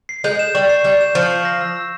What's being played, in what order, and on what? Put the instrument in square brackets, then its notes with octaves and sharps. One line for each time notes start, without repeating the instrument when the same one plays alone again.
[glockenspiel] C7
[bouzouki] G#3 [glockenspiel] G6
[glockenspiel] E7
[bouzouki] G3 [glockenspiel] C#6
[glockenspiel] C7
[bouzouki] G3 [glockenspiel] G6
[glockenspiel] E7
[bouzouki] F3 [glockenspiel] C#6
[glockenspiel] C7
A#6
E6
E6